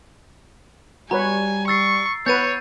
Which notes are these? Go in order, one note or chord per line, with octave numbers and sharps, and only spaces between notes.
G3 F#4 B4 C#5 G#5 A#5
C#6 E6 A6 C7
B3 B4 C#5 G6 A6 D#7